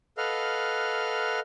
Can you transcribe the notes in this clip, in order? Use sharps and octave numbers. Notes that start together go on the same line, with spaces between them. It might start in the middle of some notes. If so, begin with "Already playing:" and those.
A4 B4 D#5 F5 F#5 F6